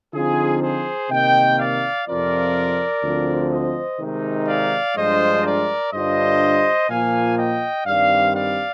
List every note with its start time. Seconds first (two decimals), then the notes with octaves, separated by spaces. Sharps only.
0.14 D3 F3 C4 D#4 F4 G#4
0.62 G#4 C5
1.10 C3 D#3 A#3 D#5 G5
1.58 D5 F5
2.07 F2 C3 F3 C4 F4 A#4 D5
3.03 D2 D3 F3 C4
3.51 C5 D#5
4.00 C3 D#3 G#3 D#4
4.47 D5 F5
4.96 G2 F3 G#3 D4 F4 C5 D#5
5.44 A#4 D5
5.92 G2 D3 G3 D4 F4 C5 D#5
6.89 A#2 F3 A#3 F4 F5 G#5
7.37 D#5 G5
7.85 G2 D#3 G3 C4 D5 F5
8.34 D5 F5